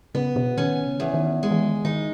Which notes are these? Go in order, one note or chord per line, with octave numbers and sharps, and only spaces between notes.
C#3 B3
B2
D#3 C#4
C#3
E2
D#3
G#3
E3
D#3
D#3 D#4